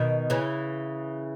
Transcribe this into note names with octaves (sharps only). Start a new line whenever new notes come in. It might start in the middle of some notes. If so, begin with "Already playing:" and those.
Already playing: B2 D#3
C#3 E3